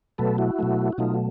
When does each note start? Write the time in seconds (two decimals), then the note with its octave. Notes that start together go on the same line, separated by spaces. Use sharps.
0.18 B2 F#3 A3 A4 B4
0.38 E4 F#4
0.59 B2 F#3 A3
0.92 F#4
0.98 B2 F#3 A3 D#4 F4